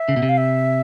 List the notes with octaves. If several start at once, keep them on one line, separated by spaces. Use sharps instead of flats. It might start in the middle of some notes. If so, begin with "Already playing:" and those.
Already playing: E5
C#3
B2
C3
F5
E5